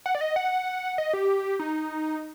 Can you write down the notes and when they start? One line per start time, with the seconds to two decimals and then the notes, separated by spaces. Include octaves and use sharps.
0.06 F#5
0.15 D5
0.21 D#5
0.36 F#5
0.98 D#5
1.13 G4
1.59 D#4